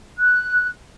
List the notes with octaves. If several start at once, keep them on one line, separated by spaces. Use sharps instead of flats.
F#6